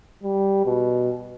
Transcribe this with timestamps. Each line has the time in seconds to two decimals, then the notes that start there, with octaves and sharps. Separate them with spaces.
0.23 G3
0.65 B2